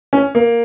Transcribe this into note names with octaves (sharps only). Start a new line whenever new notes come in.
C#4
A#3